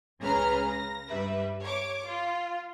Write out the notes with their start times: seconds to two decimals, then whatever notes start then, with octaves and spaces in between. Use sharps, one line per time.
0.21 C#2 C#3 G#4 B4 A#5 F6
0.68 A#6
1.08 G2 G3 B4 E5
1.62 C#5 D6
2.05 F4